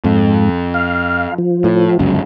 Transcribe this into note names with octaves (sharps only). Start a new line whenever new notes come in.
F2 G#2
F5
F3
A2
G1 C#2 F#2